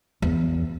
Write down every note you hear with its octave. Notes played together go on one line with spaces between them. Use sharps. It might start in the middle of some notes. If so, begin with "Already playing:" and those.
E2